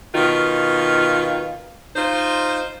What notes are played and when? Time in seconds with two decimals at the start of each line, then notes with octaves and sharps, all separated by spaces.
0.15 B2 D#3 F4
1.96 D#4 F4 C5